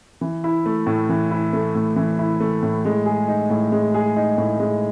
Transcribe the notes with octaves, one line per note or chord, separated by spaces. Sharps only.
E3
E4
A3
A2
E3
E4
A3
A2
E3
E4
A3
A2
G#3
G#4
D#4
A2
G#3
G#4
D#4
A2
G#3